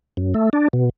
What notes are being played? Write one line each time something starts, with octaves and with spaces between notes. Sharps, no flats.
F#2
A3
D4
B2